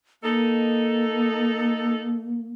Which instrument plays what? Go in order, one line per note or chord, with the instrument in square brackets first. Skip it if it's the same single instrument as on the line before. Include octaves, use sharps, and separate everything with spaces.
[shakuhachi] A#3 [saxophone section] D#4 A4